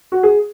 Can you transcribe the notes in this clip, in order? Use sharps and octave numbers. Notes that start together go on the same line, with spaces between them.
F#4
G#4